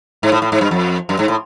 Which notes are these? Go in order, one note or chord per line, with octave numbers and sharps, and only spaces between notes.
G#2
A2
A2
G#2
G2
F2
F#2
G#2
A2